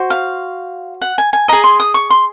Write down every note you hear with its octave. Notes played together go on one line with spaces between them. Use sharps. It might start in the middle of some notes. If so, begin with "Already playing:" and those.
Already playing: F#4 C5
F5
F#5
G#5
G#5
G#4 D#5 A#5
C6
D#6
C#6
C6